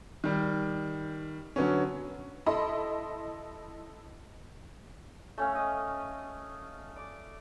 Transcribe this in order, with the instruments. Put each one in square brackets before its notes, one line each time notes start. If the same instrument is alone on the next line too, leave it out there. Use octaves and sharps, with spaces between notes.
[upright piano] D#3 G3
D3 F#3 B3 C#4
[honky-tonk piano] E4 A4 D#5 B5 C6
[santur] A3 C#4 F5
D#5
D5